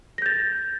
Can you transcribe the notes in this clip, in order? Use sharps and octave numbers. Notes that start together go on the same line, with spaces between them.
G6 A6 A#6